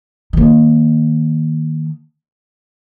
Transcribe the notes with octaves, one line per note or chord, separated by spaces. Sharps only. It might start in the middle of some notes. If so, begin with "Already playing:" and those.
D#3 A#3